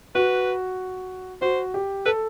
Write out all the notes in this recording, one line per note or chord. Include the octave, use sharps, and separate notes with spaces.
F#4 B4
F#4 C5
G4
A4 B4